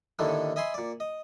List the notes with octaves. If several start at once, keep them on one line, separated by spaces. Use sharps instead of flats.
D#2 A2 D3 D#3 A3
D#5 E5 G#5 B5 C6
A#2 D5
D#5